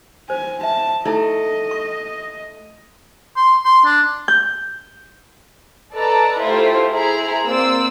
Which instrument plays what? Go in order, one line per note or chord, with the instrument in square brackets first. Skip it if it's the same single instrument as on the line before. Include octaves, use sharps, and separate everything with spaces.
[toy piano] C5 [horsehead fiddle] G#5
[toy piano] E5 [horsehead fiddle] A5
[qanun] A3 [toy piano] D#4 E4 A4 [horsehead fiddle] D#5
[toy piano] C#6
[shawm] C6
C6
D4
[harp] G6
[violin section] A4 B4 D5 D#5 A5 A#5
A3 E4 F4 G4 C5
E4 G#4 C5 A#5
A#3 C4 C5 D5 E6